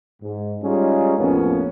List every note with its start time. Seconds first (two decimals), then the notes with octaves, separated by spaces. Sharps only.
0.22 G#2
0.62 G3 G#3 C#4 D#4 F4 G#4
1.18 A1 F2 A#3 B3 C#4